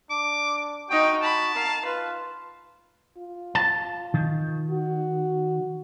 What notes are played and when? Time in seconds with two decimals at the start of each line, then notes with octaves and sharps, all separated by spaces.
0.10 D4 D6
0.90 D#4 F#4 D#5 G5
1.22 A5 B5
1.55 A#4 F5
1.85 F4 B4
3.18 F4
3.55 A5
4.14 D#3
4.71 F#4